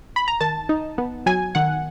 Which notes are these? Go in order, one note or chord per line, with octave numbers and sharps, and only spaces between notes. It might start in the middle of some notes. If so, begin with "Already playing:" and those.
B5
A#5
D#3 A5
D#4
B3
F#3 G#5
D#3 F#5